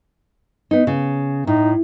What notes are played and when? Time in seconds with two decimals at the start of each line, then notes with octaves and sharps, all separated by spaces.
0.71 B3 D#4
0.87 C#3
1.47 A2 D#4